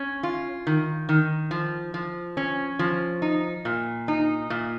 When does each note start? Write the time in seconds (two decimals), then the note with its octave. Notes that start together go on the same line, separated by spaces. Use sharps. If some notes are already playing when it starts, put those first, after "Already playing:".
Already playing: C#4
0.23 F4
0.67 D#3
1.09 D#3
1.51 F3
1.94 F3
2.37 C#4
2.79 F3
3.22 D#4
3.65 A#2
4.08 D#4
4.50 A#2